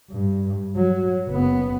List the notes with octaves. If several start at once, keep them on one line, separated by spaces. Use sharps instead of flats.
G2
F#3
F#1 B3